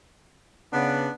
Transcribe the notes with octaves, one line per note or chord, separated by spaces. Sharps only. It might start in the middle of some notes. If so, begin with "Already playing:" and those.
C#3 B3 D4